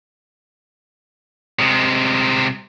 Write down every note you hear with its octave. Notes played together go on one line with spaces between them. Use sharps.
C3 G#3